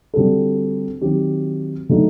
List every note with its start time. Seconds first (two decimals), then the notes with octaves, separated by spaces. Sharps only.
0.14 D3 G3 C4 F#4 A4
1.01 D#3 F#3 C4 G4
1.89 D3 F#3 A3 D#4